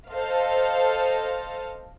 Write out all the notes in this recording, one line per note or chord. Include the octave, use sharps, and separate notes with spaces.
A4 C5 D#5 F5